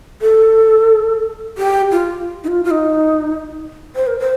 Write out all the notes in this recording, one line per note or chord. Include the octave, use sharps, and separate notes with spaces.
A4
G4
F4
D#4
F4
F4
D#4
C5
A#4
C5